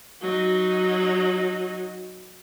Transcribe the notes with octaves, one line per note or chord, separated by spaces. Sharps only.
F#3 D#4